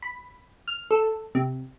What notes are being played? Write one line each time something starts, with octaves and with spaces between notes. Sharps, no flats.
B5
F6
A4
C3